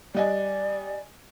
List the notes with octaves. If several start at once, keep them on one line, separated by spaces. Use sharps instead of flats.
G3 D5 D#5 G#5